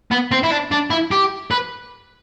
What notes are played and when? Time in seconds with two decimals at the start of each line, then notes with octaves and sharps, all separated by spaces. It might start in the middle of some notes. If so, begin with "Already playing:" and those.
0.11 B3
0.31 C4
0.43 E4
0.51 D4
0.72 D4
0.90 E4
1.11 G4
1.51 B4